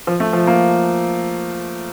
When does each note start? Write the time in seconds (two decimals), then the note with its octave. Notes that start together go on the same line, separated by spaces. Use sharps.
0.07 F3
0.20 A3
0.33 F3
0.47 A#3